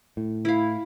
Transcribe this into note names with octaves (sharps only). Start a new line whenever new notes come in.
A2
E4 F5